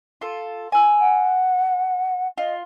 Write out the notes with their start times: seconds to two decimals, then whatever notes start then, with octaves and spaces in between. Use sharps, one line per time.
0.21 F4 A4
0.72 G#5 E6
1.00 F#5
2.38 F4 D#5